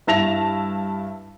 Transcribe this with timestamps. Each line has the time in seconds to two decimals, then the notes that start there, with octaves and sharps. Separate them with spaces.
0.07 G2 E4 A5 A#6 F7